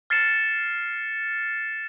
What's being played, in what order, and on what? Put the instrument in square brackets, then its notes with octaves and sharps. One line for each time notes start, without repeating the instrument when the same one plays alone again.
[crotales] F6 A6 C7 C#7 E7